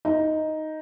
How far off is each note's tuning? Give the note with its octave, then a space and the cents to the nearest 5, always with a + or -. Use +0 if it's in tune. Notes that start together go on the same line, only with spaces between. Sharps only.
D#4 +5